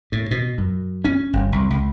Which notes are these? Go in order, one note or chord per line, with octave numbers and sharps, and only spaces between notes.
A2
B2
F#2
C#4
G1
C2
C#2